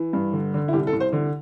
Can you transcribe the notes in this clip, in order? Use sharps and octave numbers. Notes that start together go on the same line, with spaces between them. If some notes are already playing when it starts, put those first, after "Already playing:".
Already playing: E3
G2
D3
D3
E4
C2 G4
A4
C2
C5
D3